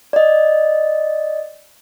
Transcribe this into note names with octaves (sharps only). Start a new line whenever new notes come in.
D5 D#5